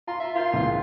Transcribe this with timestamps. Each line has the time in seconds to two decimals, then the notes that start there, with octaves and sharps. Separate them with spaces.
0.08 F4 A#5
0.20 E5
0.35 F4 A#4 C6 G6
0.53 C#2 A#2 E3